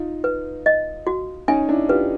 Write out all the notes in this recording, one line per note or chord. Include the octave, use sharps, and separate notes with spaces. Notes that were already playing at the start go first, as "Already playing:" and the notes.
Already playing: D#4 F4
B4
D#5
F#4
C#4 D#4 G#5
D4 E4
F4 G4 B4